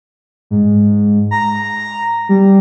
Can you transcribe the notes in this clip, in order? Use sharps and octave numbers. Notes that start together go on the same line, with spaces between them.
G#2
A#5
G3